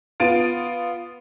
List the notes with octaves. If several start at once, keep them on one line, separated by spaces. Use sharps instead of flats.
B3 F4 A6 D7 D#7